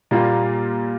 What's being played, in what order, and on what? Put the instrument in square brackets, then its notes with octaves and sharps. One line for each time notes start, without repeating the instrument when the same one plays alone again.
[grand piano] A#2 G3 A#3 F4